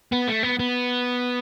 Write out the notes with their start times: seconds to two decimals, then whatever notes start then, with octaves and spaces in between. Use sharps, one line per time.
0.12 B3
0.28 A3
0.43 B3
0.59 B3